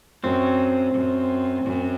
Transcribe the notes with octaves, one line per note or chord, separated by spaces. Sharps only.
F#2 C4
F#2
F#2